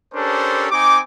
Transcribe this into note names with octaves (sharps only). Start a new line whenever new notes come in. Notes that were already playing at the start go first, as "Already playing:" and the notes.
C#4 D4 G4 A4 A#4 C5
C4 D#4 G#5 D6